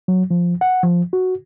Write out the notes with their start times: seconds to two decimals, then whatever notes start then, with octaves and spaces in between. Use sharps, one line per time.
0.08 F#3
0.31 F3
0.61 F#5
0.83 F3
1.13 F#4